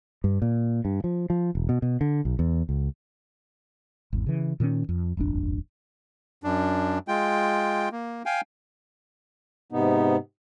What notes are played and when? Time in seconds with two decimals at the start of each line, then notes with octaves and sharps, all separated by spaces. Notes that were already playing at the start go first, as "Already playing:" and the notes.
0.24 G2
0.42 A#2
0.85 G2
1.04 F3
1.30 F3
1.55 E1
1.69 B2
1.82 B2
2.01 D3
2.25 B1
2.39 E2
2.69 C#2
4.13 G#1 E2
4.26 C#3 E3
4.60 A#2 D#3 C4 C#4
4.89 F2
5.17 D#1 G#1 F2 D4
6.44 F#2 D4
7.08 G#3 F4 G5
7.92 A#3
8.26 F5 G5 G#5
9.72 G#2 C3 B3 D#4